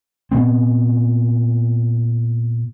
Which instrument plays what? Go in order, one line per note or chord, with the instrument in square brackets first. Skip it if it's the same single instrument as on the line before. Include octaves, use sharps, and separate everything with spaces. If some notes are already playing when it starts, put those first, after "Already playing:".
[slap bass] A#2 B3 C4